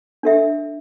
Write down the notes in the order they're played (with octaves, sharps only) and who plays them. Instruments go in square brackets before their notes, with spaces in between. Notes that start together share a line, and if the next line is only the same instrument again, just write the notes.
[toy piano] D4 A4 E5